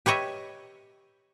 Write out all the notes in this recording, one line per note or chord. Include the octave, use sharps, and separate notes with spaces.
G4 B4 C#5 D#5 E5